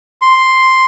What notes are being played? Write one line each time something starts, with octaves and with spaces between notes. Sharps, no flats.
C6